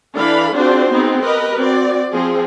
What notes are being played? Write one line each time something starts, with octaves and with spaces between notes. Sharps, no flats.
E3 D4 A4 F5 B5
C4 D4 F4 F#4 G#4 C5
B3 C4 D#4 G#4
G4 A#4 B4 D#5
C4 F#4 D5
F3 C4 G#4